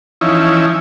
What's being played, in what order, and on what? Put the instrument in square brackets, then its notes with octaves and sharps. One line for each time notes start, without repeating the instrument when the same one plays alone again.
[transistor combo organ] E3 F3 C#4 D#4 E4